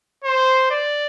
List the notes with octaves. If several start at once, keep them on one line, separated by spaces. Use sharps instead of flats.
C5
D5